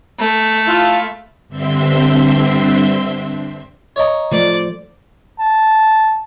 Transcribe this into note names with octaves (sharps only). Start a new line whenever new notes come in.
A3
E4 F4 A4
G2 D3 C4 E5 C6
C#5 D#5 A#5
F3 A3 C5 D5
A5